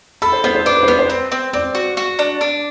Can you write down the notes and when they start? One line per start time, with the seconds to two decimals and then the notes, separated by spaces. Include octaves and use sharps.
0.22 A4 B5
0.32 C5
0.44 B3 C5
0.55 C5
0.65 D4 B4
0.77 B4
0.83 C5
0.88 B3 B4
0.99 C5
1.10 C4
1.32 C4
1.53 C4 D5
1.75 F#4
1.97 F#4
2.19 D4
2.41 D4